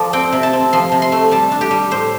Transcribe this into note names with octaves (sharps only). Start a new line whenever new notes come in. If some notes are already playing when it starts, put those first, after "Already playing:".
Already playing: F3 A4 D5
C4 G5
C3
A5
C4
F3 C6
C3
C6
A3
G3 A5
D4
G4
G3
A2 C5